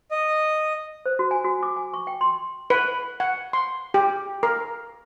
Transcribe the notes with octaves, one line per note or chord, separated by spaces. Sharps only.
D#5
C5
F#4
G#5
F#4
D6
G#5
C#6
G5
C6
B4
F#5
C6
G4
A#4